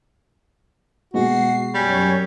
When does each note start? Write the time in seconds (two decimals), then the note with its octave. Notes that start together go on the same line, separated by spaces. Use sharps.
1.14 B2 G#3 B3 F#4 C7
1.74 F#2 G3 C#5 G#5